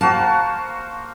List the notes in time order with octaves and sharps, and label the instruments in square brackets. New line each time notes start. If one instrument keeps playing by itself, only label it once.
[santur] A#3 F#4 C5 [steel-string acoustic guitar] A5